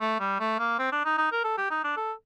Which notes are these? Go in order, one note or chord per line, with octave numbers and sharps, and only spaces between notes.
A3
G3
A3
A#3
C4
D4
D#4
D#4
A#4
A4
G4
D#4
D4
A4